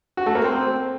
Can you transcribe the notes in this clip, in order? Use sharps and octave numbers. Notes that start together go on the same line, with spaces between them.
F#4
A3
A#3
C4